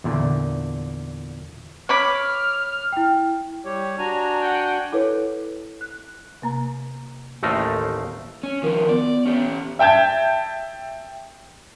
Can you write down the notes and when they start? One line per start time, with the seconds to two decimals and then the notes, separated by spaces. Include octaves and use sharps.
0.04 E2 A#2 D3
1.89 C#5 B5 D6 F6
2.92 E4 G5
3.65 G3 G4 C#5
3.98 D4 F#4 G#5 A#5
4.41 F#5 G5
4.92 E4 A4 B4 C#5
5.81 F#6
6.42 C3 A#3 A#5
7.43 A1 D#2 A3 D#4 A#4 C5
8.43 C#4
8.63 D#3 F3 A#4
8.89 B3 D5
9.25 C#4 G4
9.79 E5 G5 A5 G6 G#6